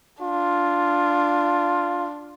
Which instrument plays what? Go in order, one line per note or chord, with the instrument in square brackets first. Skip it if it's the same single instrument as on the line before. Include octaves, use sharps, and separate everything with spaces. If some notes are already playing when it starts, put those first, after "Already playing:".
[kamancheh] D4 [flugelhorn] F4